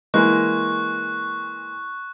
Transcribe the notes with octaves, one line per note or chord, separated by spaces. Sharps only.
E3 G#3 A#3 C#6 F#6